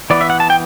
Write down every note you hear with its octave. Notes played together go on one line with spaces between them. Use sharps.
E3 B3 D5
E5
F#5
A5
G5